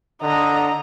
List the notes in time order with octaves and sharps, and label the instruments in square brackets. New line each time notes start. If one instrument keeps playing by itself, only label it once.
[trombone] D3 [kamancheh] D#5 A#5